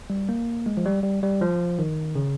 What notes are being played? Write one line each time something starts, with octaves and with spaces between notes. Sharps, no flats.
G3
A#3
G#3
F3
G3
G3
G3
F3
D#3
C#3